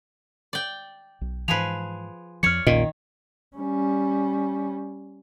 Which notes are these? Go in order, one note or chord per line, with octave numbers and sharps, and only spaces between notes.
D5 G5
B1
G#2 E3 F3 G#4 B4 F7
F2 F3 C#5 D5 F6 C#7
A#1 E2 A#2 D#3 C#4 D#5
G3 C#4